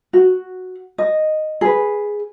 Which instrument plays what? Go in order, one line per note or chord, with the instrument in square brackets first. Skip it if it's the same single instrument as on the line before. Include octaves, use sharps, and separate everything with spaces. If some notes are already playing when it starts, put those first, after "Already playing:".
[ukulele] F#4
D#5
G#4 B4